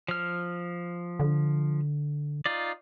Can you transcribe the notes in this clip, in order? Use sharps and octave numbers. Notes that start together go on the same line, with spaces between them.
F3 F6
D3
D#4 F4 D5